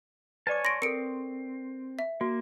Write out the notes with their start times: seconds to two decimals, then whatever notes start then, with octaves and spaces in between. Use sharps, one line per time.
0.47 B4 C#5 D5 G#5 A5 D6
0.65 C6 C#6 A#6 D7
0.82 C4 A4 A#4 C#7 D7
1.99 E5
2.21 A#3 F#4